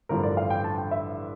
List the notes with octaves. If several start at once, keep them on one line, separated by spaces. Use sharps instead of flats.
A1 G2 D3 F3 A#4
D5
F5
G5
A5
G5
E5